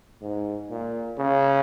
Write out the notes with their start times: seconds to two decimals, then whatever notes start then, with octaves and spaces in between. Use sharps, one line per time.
0.22 G#2
0.70 A#2
1.19 C#3